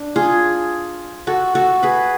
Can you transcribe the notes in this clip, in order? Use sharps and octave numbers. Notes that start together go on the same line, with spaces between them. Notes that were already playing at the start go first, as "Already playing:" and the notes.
Already playing: D4
F4 G#4
F#4 A4
F#4 A4
G#4 B4